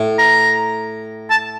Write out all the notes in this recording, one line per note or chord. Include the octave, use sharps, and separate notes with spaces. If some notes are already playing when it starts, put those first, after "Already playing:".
Already playing: A2
A#5
A5